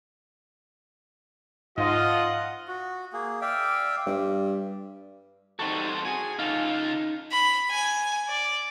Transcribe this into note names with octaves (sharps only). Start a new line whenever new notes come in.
G#2 F3 F4 D#5 F5 F#5
F#4
A#3 G#4
D5 E5 F5 G5
G2
G3 C4 D#4 F#4 A4
F#4 G#4 G#5
C#3 D#4 F4 A4 F5
B5
G#5
D5